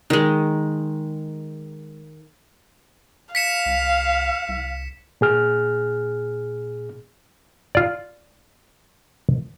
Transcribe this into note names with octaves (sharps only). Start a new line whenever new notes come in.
D#3 G#3
F5 B6 C#7 E7
C2
C2
A#2 G#4 F6
F4 D5